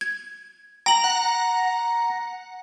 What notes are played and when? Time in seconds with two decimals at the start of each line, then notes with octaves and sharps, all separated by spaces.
0.01 G#6
0.86 G5 A#5 F#7
1.04 F#5 A#5